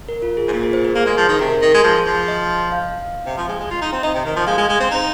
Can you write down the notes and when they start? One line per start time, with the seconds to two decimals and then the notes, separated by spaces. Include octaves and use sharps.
0.09 A#4
0.22 F4
0.37 G#4
0.48 G#2
0.51 A#2 F4
0.63 G#4
0.73 C5
0.85 A#4
0.95 A#3 G#4
1.06 G#3
1.17 F3
1.29 D#3
1.39 C3 A#4
1.62 D#3
1.74 G#3
1.84 F3 G#4
2.06 F3
2.28 D#5
2.72 F5
3.26 C3
3.37 F3
3.48 G#3
3.60 G#3
3.71 F4
3.82 D#4
3.92 C4
4.03 D#4 D#5
4.14 C3
4.25 D#3
4.36 F3
4.47 G#3 F5
4.58 G#3
4.69 G#3
4.80 C4
4.91 D#4